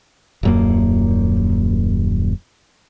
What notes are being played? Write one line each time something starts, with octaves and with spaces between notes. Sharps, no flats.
D#1 F#2 A#3